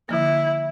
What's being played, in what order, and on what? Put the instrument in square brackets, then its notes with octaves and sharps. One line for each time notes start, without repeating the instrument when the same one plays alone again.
[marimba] D3 F3 A#3 [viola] E4